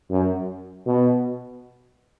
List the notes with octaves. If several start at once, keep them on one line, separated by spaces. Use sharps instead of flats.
F#2
B2